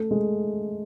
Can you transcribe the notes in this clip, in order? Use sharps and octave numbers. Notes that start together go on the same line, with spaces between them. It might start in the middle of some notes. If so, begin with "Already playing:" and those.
Already playing: A3
G#3